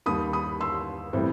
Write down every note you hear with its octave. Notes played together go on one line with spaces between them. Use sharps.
D#2 D#3 G3 B5 D#6
B5 D#6
C6 E6
A2 E3 G3 C4